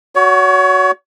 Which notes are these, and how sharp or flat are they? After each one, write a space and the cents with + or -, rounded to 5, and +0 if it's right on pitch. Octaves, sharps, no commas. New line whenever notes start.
F#4 +0 C#5 +35